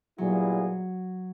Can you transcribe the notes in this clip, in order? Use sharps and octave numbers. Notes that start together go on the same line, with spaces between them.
A#2 F#3 G3 B3 E4 G#4